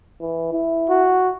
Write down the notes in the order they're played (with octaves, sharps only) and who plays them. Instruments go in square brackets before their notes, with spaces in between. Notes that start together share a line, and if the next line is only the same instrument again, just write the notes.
[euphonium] E3
E4
[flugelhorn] F#4